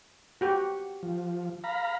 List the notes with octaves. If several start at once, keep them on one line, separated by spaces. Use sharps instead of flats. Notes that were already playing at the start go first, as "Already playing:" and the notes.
F#4 G4
F3
F5 A#5 B5